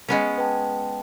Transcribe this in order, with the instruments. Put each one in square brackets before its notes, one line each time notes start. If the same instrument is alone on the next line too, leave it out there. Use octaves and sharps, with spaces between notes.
[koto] G#3 B3 C#4
[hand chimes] B4 G5 A5